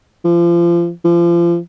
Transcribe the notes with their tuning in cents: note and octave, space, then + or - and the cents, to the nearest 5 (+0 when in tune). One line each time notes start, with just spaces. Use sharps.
F3 -30
F3 -30